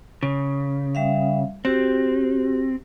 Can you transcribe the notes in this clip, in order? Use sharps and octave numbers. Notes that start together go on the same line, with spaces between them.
C#3
G3 E5 F5
C4 F#4 G4